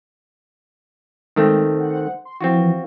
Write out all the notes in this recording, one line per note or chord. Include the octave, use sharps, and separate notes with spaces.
D#3 G#3 A3 C4
C5 F#5
C6
E3 F3 C4 F4 F#4